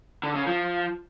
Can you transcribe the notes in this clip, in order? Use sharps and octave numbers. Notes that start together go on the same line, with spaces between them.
D3
C#3
F3